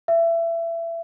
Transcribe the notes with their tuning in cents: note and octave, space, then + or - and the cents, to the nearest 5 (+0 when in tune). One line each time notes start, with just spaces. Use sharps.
E5 +25